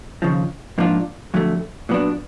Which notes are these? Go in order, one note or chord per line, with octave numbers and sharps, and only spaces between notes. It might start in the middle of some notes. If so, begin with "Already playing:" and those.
D#2 C#3 F3
G#2 F3 A#3 D4 F4
F2 D3 F#3 A3
A#2 F#3 B3 D4